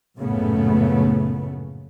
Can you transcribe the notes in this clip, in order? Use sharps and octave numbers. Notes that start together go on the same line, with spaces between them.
A#1 F#2 A2 C#3 A3 B3